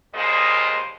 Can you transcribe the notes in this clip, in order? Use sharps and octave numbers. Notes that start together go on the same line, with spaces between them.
D#2 A#2 G3 G#3 C5 D#5